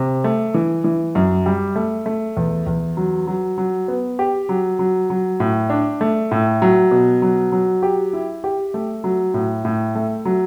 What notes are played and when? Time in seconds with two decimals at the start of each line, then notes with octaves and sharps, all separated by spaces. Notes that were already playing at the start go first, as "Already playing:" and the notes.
Already playing: C3
0.24 A3
0.54 E3
0.84 E3
1.15 F#2
1.46 G3
1.76 A3
2.06 A3
2.37 E2
2.67 E2
2.97 F#3
3.27 F#3
3.58 F#3
3.88 B3
4.19 G4
4.49 F#3
4.79 F#3
5.10 F#3
5.40 A2
5.70 D4
6.01 A3
6.31 A2
6.62 F#3
6.91 B2
7.22 F#3
7.52 F#3
7.82 G4
8.13 E4
8.44 G4
8.74 A3
9.04 F#3
9.34 A2
9.65 A2
9.95 A3
10.25 F#3